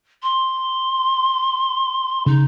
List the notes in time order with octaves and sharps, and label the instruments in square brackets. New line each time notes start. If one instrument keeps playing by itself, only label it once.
[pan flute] C6
[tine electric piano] C#3 [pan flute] D#4